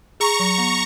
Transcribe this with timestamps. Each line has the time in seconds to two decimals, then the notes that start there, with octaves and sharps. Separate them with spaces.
0.20 G#4 A#5 C#6
0.40 F#3
0.58 B3